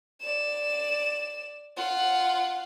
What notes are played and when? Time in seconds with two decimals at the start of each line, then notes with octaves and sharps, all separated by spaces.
0.21 D5 E7
1.77 F4 F#5